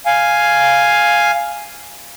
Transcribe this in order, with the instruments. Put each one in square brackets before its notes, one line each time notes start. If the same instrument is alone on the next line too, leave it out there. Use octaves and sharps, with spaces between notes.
[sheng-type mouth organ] F5 G#5